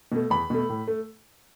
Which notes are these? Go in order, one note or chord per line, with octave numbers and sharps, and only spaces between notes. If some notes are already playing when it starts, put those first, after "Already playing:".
B2 A3
E2 B5
B2 A3
A2
A3